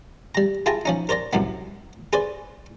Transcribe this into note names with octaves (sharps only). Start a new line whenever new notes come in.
G3 A#5
E4 F4 G#4 G5 A5 A#5
F3 C#4 D#4
A#4 C5 D5 A#5
C2 F#2 A2 B3
G#4 B4 C5 D5